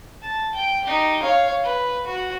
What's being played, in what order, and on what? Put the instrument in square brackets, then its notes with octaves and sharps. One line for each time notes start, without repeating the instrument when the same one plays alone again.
[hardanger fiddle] A5
G5
D#4 G4
C#5 F5
B4
F#4